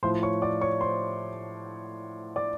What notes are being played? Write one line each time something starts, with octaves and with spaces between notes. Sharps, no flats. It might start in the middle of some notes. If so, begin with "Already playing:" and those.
A2 F3 C5 C6
C#5 C#6
D5 D6
C#5 C#6
C5 C6
D5 D6